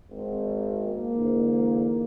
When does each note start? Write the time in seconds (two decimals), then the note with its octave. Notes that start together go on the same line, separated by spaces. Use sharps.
0.11 G#1
0.85 A#3
1.17 G#2 D3 E3